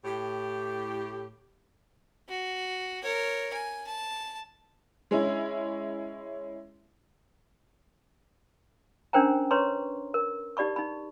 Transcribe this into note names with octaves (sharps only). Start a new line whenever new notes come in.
A2 G4
F#4
A#4 C#5
G#5
A5
G#3 C#4 E4
C#4 D4 A#4 C5 G5 A#5
B4 C#5 A#5 C6 C#6
A#4
D#4 G4 D5 B5 C#6
D#4 B5